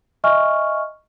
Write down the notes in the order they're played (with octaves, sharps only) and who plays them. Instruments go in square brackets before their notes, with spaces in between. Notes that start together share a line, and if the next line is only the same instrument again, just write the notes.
[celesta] D#5 E5 G#5 C#6 F6